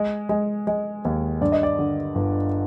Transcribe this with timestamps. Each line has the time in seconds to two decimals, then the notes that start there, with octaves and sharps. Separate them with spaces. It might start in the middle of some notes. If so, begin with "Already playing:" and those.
Already playing: G#3
0.29 G#3
0.67 G#3
1.05 D#2
1.41 G2 D5
1.52 D#5
1.63 D5
1.79 D3
2.15 G1